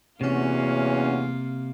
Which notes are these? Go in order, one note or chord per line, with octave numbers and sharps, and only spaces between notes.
E2 C3 A#3 C#4 F4 F#4